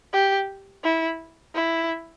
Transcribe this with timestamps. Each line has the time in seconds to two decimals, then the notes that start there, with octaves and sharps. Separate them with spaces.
0.13 G4
0.84 E4
1.55 E4